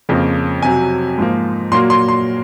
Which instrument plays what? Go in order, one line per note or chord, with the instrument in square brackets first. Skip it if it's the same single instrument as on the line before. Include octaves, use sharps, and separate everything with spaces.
[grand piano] F2 C#3 F3 A#3
F2 C3 F#3 G#5
G#2 F3 A#3
A#2 F#3 A#3 C6
C6
C6